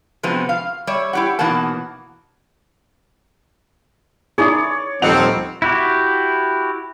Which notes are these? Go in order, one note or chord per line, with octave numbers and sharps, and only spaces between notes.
C3 F3 G#3 B3 C4 F#4
F5
G3 C#5 D5 E5
E4 G4 F#5
B2 E3 A#3 D#4 F#5 A5
D#4 E4 G#4 C#5 D5
D#1 F3 C4 D#4 A4 F#5 F7
E4 F#4 G4